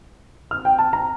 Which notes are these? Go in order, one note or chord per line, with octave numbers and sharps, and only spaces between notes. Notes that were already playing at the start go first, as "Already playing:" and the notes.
F6
G5
A5
A#5